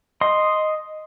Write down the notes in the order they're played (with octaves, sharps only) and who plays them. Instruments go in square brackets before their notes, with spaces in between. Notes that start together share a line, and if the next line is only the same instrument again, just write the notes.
[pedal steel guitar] D#5 C6